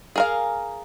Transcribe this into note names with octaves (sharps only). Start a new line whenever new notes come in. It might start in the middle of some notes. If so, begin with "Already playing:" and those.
G#4 A#4 F5